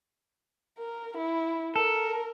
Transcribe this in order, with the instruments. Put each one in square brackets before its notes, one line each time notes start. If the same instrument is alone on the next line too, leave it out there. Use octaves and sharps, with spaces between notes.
[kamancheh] A#4
E4
[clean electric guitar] A4 [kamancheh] A#4